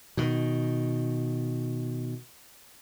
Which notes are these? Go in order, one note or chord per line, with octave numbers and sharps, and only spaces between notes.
B2 D#3